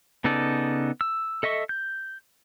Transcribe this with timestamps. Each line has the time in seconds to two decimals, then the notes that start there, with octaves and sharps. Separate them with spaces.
0.24 C#3 B3 D#4 A4 D5
1.01 E6
1.43 A4 D#5 E5 C#6
1.69 G6